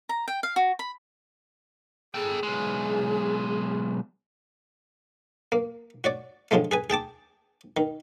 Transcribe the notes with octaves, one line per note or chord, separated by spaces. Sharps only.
A#5
G5
F5
F#4
B5
G#4 A4 G5
B1 G#3
A#3
F#4 C#5 D5
A2 D3 F3 G#3 A3
G#4 B4 G#5
G#4 G5 A5 D6
D#3